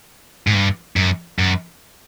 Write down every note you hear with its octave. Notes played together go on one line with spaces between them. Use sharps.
G#2
G2
F#2
F#2